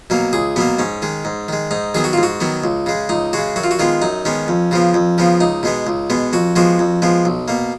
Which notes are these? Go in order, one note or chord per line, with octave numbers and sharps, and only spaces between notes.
B2 F#3 A#3
C#2 G#4
B2 F#3 A#3 B3
G#2 C#4
D#3 G#3
G#2
D#3 G#3
G#2 D#4
D#3 F#3 B3 G#4
F#4
G#2 F4
F#4
D#3 F#3 B3
C#2
C#3 G#3
C#2 D#4
C#3 G#3 F#4
F#2 F#4
F4
F#4
D#3 G#3 B3 F4
F#2 D#4
D#3 G#3 B3 C#4
F2
C#3 F3 B3
F2
C#3 F3 B3
C#2 D#4
B2 G#3 B3
C#2
B2 G#3 B3
F2 F#4
F3 G#3 B3 F#4
F2
F3 G#3 B3
B1
B2 A#3